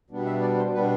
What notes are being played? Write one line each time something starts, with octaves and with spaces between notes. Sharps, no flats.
B2 G3 B3 D4
E5
D5
C5
B2 G3 B3 D4 B4